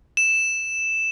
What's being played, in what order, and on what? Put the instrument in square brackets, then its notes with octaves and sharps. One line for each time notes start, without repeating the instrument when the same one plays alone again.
[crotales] E7